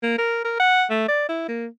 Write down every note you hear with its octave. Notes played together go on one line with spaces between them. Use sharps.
A#3
A#4
A#4
F#5
A3
D5
E4
A#3